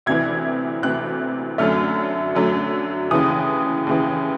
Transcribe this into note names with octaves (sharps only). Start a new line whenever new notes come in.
D2 C3 E3 G#6
D2 C3 E3 F#6
F#2 D3 F#3 A3 F6
F#2 D3 F#3 A3
D#2 C#3 E3 D#6
D#2 C#3 E3